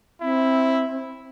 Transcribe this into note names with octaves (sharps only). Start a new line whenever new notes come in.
C4 E4